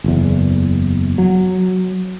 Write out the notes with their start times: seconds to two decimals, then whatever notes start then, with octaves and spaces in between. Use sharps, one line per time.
0.04 F#1 E2
1.18 F#3